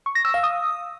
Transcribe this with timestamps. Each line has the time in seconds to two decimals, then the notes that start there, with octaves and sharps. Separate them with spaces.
0.06 C#6
0.15 A#6
0.25 E6
0.34 F5
0.43 D#6